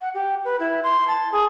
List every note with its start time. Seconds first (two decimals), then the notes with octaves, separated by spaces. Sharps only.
0.01 F#5
0.14 G4
0.44 B4
0.59 E4
0.83 C6
1.07 A5
1.32 G#4